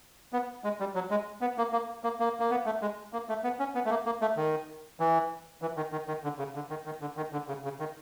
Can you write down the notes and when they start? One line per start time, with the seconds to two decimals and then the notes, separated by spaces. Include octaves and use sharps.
0.33 B3
0.64 G#3
0.80 G3
0.95 F#3
1.11 G#3
1.41 B3
1.58 A#3
1.72 A#3
2.04 A#3
2.20 A#3
2.40 A#3
2.51 B3
2.66 A3
2.82 G#3
3.13 A#3
3.29 A3
3.44 B3
3.59 C#4
3.75 B3
3.85 A3
3.90 A#3
4.06 A#3
4.21 A3
4.37 D#3
5.00 E3
5.62 E3
5.77 D#3
5.92 D#3
6.08 D#3
6.24 D3
6.39 C#3
6.55 D3
6.70 D#3
6.86 D#3
7.01 D3
7.17 D#3
7.33 D3
7.48 C#3
7.64 C#3
7.80 D#3